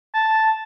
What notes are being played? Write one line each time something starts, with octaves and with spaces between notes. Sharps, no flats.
A5